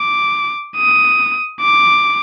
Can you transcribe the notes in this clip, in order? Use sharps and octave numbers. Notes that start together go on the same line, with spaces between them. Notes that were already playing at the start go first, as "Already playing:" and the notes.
Already playing: D6
D#6
D6